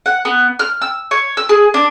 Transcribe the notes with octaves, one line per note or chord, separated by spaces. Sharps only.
F#5
B3
F6
E6
C#5
E6
G#4
D4